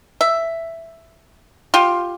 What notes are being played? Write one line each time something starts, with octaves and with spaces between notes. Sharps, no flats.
E5
F4 G4